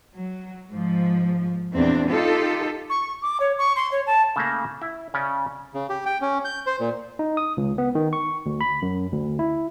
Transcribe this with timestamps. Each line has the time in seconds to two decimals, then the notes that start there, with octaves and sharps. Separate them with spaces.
0.16 F#3
0.71 G#2 F3
1.71 E2 A#2 C4 D4
2.09 D#4 F4 G4 A4
2.90 C#6
3.22 D6
3.40 C#5
3.58 C#6
3.76 C6
3.92 C#5
4.07 A5
4.36 C#3 A3 A#3
4.82 E4
5.14 C#3 C#4 D5
5.74 C#3
5.89 G4
6.06 G5
6.21 C#4
6.45 G6
6.66 C5
6.80 A#2
7.19 D#4
7.37 D#6
7.57 C#2
7.78 B3
7.95 D#3
8.13 C#6
8.46 D2
8.61 B5
8.82 F#2
9.13 D2
9.39 E4